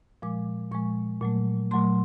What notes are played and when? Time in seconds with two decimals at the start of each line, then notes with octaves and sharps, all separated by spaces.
0.22 A#2 F3 G#3 D6
0.72 A#2 F3 G#3 C#6
1.21 A#2 F#3 A3
1.71 A#2 F#3 A3 C6